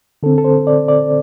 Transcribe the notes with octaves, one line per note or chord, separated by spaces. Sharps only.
D3 C4 A4
A4
C5
D5
D5